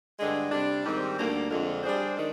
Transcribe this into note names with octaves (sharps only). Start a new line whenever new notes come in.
G2 D3 G#3 D4 G#4
C3 G3 D4
G#2 D#3 G3 C4
D2 D3 G3 A#3
F2 D3 G#3 D4 F4
G3 D4 G#4 C5
D#3 G#3 D4